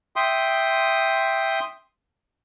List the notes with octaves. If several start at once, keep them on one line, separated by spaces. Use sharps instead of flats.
E5 G5 C6 D#6